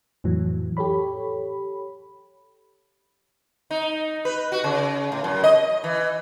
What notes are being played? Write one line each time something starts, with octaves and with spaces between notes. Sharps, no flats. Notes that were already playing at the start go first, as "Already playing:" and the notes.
F2 A2 E3 F#3
G4 A4 C#5 B5
D#4
B4
F#4
C#3
A2
F#2
D#5
E3